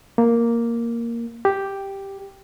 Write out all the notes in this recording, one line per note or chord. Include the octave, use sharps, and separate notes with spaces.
A#3
G4